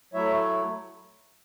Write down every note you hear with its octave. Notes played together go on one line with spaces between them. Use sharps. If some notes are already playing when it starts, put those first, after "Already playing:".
F#3 A3 E4 C#5 E5